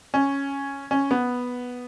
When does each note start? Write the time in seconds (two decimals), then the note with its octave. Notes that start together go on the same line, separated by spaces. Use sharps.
0.14 C#4
0.91 C#4
1.11 B3